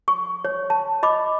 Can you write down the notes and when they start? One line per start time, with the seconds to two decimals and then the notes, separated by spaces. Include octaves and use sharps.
0.08 C#6
0.45 C#5
0.70 A5
1.03 D#5 B5 D6